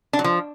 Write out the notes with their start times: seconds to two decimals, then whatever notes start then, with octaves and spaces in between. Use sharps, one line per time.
0.13 D4
0.19 F#3
0.24 F3